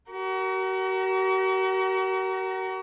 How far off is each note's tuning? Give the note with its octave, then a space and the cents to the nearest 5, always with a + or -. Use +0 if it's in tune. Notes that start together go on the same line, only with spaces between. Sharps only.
F#4 +40 A#4 +0